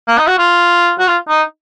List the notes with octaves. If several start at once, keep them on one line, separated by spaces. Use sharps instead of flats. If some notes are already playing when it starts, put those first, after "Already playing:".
A#3
D#4
F#4
F4
F#4
F4
D#4